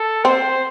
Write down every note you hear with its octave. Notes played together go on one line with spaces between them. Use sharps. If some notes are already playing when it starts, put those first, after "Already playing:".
Already playing: A4
C4 C5